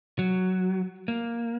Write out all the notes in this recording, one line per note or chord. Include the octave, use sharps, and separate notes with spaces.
F#3
A#3